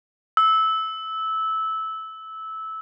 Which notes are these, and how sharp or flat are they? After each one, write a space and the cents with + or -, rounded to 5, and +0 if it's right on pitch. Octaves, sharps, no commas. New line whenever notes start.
E6 -15